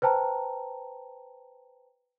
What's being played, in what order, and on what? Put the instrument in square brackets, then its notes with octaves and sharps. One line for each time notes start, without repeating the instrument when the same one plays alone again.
[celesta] B4 C5 G5 A5 A#5